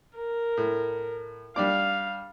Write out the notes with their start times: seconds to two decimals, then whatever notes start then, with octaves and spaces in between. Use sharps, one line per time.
0.16 A#4
0.57 A2
1.56 G3 D4 F5 D6